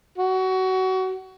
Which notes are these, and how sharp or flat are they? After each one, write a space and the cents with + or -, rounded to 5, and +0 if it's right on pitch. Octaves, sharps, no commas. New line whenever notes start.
F#4 +25